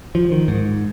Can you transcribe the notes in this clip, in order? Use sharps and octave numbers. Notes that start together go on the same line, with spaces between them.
F3
D#3
G#2